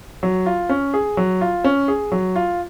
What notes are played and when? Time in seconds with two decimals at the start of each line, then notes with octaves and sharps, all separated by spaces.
0.23 F#3
0.46 F4
0.69 C#4
0.94 G#4
1.17 F#3
1.41 F4
1.64 C#4
1.88 G#4
2.12 F#3
2.36 F4